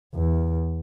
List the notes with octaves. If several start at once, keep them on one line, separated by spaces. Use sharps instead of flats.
E2